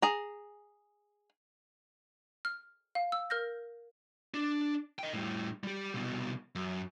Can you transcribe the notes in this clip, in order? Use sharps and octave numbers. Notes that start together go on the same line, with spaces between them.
G#4 A#5
F6
F5
E6
A#4 F6 G6 A#6
D4
D#5 G5
A2 G3
G3 G4
C2 B2
F#2